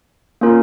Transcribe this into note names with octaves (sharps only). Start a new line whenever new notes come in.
A#3 C#4 F4 A#4